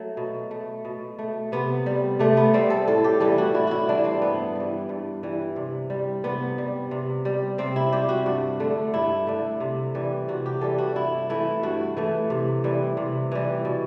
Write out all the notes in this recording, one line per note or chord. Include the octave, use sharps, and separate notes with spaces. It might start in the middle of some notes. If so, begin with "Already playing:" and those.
Already playing: F#3 A3
B2
A3
B2
A3
C3 B3
G3
C3 A3
B3
G3 C4
A4
A2 A4
G4
E3 G3 A4
F#4
A2 E4
E4 F#4
E3 G3 D4
C4
G2 B3
E3 G3
G2
E3 G3
C3
G3
C3 B3
G3
C3
G3
C3 C4
E4
G3 G4
F#4
G2
D3 A3
G2 E4
D3 A3
C3
E3 G3
C3 F#4
G4
E3 G3 A4
F#4
G2 E4
E3 A3 E4
G2 F#4
E3 A3
C3
E3 G3
C3
E3 G3
B2